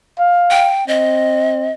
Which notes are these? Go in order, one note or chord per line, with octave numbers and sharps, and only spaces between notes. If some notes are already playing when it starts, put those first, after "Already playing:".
F5
G5
C4 D#5